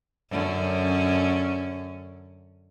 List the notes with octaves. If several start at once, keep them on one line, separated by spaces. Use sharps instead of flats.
F#2 D3 C#4